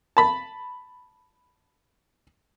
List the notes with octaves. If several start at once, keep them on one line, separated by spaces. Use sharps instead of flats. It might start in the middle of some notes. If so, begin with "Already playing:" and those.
A5 B5